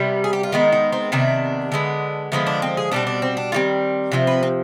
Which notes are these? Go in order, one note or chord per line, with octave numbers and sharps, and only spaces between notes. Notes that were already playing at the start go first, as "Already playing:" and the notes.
Already playing: C3 G3 B3
G#4
G4
F4
D#3 G#3 B3 D#4
D#4
C4
C3 D#3 B3 D4
D3 G#3 B3
D3 F3 G#3 B3 D#4
D4
C4
G#4
B2 G3 C4 D4
D4
C4
D4
D#3 G3 C4 F4
C3 F3 C4
B4
C4